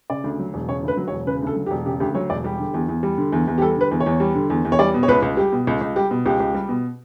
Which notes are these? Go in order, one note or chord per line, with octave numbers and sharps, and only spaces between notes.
C#3 D5
D2
F#3
E1
C#3 C#5
D2 B4
F#3
C#5
E1
C#3 B4
D2 A4
F#3
G4
E1
C#3 G4
D2 G4
F#3 C#5
E1 D5
G3 G4
D3
E2
E2
G3
D3
E2
E2
G4
G3 A4
D3 B4
E2
C#5
E2
G3
D3
E2
E2
C#5
G3 D5
B2
C#5
C#2 B4
C#2
G3 G4
B2
C#2
C#2
G3 G4
B2
C#2 G4
C#2
G3
B2